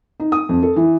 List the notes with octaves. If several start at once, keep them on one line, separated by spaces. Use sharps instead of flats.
D#4
D#6
F2
A4
E3